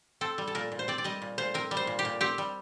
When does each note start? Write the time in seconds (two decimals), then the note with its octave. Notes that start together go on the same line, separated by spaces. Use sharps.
0.21 C4 A4
0.38 G3
0.47 A4
0.55 A#2 A#4
0.72 A#2
0.79 C5
0.88 C4 D5
0.98 D5
1.04 G3 D#5
1.22 A#2
1.38 A#2 C5
1.54 C4 A#4
1.71 G3
1.77 C5
1.87 A#2
1.99 G4
2.05 A#2
2.21 C4 G4
2.38 G3